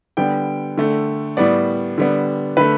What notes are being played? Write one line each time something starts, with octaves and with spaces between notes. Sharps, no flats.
D3 G3 B3 G5
D3 A3
A2 G3 B3 D5
D3 G3 B3
D3 A3 B4